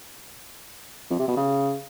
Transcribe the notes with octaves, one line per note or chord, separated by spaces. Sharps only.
F2
C3
B2
C#3